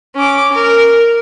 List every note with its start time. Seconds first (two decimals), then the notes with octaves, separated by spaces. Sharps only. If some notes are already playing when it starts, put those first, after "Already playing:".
0.15 C#4 D6
0.52 A#4